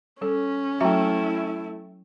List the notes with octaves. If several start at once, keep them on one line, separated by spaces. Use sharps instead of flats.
G3 C#4 A4
F#3 A3 E4 F#4 E5 G5 A#5